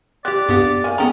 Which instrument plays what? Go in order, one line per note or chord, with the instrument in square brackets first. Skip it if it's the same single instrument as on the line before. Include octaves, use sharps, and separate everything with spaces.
[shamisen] C4 [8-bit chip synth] G4 F#6 [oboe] D5
[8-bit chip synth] G2 B3 G4
[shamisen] D#3 A#3 G#5
[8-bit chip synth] B3 C#4 A#5 [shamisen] G#4 A4 G5